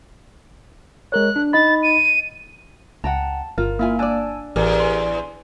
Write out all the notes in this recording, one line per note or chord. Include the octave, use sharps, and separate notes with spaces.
G#3 A#4 C#5 F#6
D4
D#4 D#5 B5 A6
D#7
C#2 F#5 G5 A5 A#5
G1 F4 A#4
A#3 E4 F4 G#5
D4 D5 G#5 A5 E6
A1 E2 G4 A#4 G#5
G#5 C6